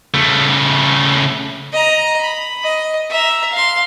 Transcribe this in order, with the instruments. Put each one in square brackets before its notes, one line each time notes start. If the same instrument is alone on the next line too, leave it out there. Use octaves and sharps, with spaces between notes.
[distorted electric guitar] C#3 A3
[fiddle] D#5 A#5
B5
D#5
E5 A#5
F5 C6